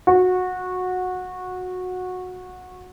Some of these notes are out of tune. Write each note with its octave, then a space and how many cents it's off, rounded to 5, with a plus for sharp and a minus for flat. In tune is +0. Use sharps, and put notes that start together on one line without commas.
F#4 -15